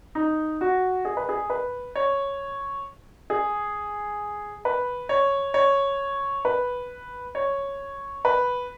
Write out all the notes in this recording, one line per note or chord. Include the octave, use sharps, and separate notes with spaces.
D#4
F#4
G#4
B4
G#4
B4
C#5
G#4
B4
C#5
C#5
B4
C#5
B4